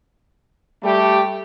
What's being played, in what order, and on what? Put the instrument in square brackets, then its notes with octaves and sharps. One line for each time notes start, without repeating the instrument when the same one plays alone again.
[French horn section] G3 A3 G4